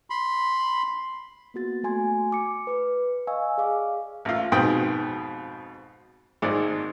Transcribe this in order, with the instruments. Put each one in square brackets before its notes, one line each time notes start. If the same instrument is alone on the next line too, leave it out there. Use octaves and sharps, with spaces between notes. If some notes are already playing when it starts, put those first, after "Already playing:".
[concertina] B5 C6
[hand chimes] A#3 B3 F#4 A6
A3 F#4 G#5 C6 G#6
D6 C#7
B4 D6
D#5 F5 G#5 C#6 E6
G#4 D5 F5 D6
[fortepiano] A1 F4
F2 G#2 B2 G5 B5 D#6
G#1 G#2 G#3 D5